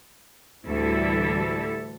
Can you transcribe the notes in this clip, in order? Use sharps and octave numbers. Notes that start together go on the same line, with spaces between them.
D2 A2 E3 G3 E4 A4